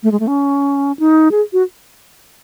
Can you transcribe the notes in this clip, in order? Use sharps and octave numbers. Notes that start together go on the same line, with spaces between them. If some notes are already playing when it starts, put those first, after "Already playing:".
A3
G#3
A3
C#4
D#4
G#4
F#4